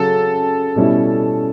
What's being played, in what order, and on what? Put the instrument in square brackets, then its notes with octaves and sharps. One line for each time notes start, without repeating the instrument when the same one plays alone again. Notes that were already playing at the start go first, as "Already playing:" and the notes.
Already playing: [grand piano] C#3 F#3 C#4 [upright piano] A4
[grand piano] B2 G3 C#4 E4